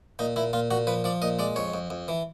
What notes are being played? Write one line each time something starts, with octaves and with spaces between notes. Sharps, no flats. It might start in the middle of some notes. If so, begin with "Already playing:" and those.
A#2 D#4
A#2 E4
A#2 F4
A#2 F#4
F3 B4
F3 D5
A#2 D#5
G#3 D5
F2 C#5
F2
F2
E3